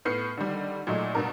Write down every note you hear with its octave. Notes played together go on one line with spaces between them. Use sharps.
A2 B3 F6 C7 C#7
D3 D#3 G3
A#2 F#3 G#3 A3 D#4
G2 B2 A#4